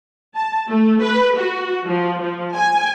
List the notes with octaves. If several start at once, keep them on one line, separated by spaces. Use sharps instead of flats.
A5
A3
B4
F#4
F3
F3
G#5